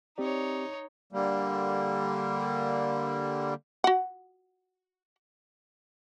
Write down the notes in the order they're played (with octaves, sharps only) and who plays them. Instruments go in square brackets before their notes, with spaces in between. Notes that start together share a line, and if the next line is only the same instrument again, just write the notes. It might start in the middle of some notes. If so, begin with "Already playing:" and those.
[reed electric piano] C4 G4 D5 [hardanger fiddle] D#4 C#5
[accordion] D3 G3 A#3
[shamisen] F#4 F#5